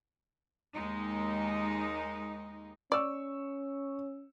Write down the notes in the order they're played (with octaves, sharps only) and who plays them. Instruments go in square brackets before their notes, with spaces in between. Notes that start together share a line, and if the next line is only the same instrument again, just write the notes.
[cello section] D#2 G#3 D#4
[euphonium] C#4 [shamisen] D5 [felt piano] C#6 E6